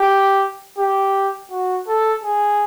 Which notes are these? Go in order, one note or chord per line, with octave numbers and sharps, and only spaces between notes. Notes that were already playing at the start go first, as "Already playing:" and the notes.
Already playing: G4
G4
F#4
A4
G#4